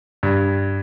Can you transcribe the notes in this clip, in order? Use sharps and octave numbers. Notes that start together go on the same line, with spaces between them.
G2